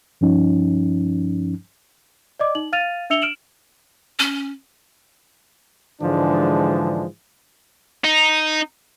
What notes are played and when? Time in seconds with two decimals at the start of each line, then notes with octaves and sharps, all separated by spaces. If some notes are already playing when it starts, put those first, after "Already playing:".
0.21 G2 F3 C#4 D#4
2.40 D5 D#5 D6
2.55 D#4 F#7
2.72 F5 F6 A6 D#7 F7
3.10 D4 E5 E6 C#7 F7 G7
3.22 F6 D7 E7 F#7
4.19 C#4
6.02 G#2 D3 E3 F3 G#3 D4
8.04 D#4